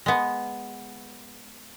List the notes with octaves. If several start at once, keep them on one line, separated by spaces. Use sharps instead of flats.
G#3 B3